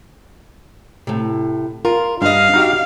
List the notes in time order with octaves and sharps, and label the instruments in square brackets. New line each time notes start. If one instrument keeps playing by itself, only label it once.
[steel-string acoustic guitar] A2 C3
[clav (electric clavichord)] F4 [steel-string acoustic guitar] A#4
[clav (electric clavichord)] G2 [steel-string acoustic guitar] D4 D#5 [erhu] F5
[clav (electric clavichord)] D#4 F#4 G4